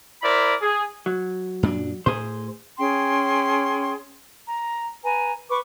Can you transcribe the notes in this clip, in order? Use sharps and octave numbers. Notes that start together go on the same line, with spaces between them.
E4 A#4 C5 D5 B5
G#4
F#3
F#2 A#2 D4
A2 G#4 C5
C#4 G#4 G5 C6
A#5
B4 G#5 A#5
B4 C#6 D6